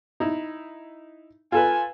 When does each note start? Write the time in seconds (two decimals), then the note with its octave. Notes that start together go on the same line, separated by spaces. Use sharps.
0.20 D#4 E4
1.52 F4 A4 B4 G#5